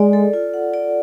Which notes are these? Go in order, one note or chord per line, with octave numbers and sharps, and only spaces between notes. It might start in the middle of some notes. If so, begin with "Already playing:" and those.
Already playing: G#3 D5
A4
F4
F#5
D5